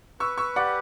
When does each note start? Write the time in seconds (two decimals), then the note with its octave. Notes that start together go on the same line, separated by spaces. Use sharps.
0.20 B4 C#6 E6
0.38 C#6 E6
0.56 G4 D5 F#5